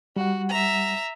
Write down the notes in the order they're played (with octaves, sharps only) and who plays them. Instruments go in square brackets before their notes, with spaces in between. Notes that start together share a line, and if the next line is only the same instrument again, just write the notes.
[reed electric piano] G3 F#5 [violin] F#4
[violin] E5 A#5